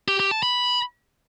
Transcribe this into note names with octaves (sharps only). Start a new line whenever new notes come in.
G4
G4
A5
B5